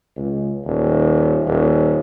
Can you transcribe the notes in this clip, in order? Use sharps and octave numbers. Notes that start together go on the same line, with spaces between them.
C#2
D#1
D#1